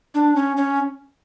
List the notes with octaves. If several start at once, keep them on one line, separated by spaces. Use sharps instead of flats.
D4
C#4
C#4